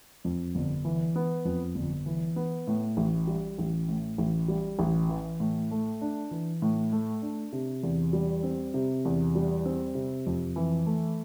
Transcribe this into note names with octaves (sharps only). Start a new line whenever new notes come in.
F2
G1
E3
B3
F2
G1
E3
B3
A2
A1
G3
A1
A2
A1
G3
A1
E3
A2
A3
D4
E3
A2
A3
D4
C3
E2
G3
C4
C3
E2
G3
C4
C3
F2
E3
A3